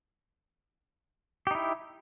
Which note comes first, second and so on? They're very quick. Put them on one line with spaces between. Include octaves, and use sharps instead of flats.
G4 D#4 E4